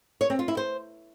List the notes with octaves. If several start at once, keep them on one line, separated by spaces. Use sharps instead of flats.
C#5
C4
F4
E4
C5